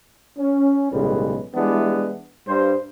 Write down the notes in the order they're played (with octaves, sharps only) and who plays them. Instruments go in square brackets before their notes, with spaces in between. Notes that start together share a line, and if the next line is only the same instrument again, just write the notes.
[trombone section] C#4
B1 A2 C#3 G3 G#3 B4
E3 G3 G#3 B3 D4 E4
G2 C5